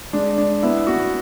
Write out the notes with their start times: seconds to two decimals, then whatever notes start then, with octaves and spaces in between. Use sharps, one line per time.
0.13 G#3 D4
0.38 D4
0.63 B3 E4
0.87 B3 F#4